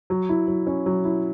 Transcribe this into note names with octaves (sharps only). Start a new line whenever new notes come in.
F#3
E4
F#3
C#4
F#3
E4